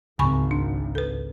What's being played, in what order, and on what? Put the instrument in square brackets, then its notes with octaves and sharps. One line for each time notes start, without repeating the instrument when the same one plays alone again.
[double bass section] G#1 [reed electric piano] C#2 [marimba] G#5 B5 C#6
[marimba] D4
A4 B4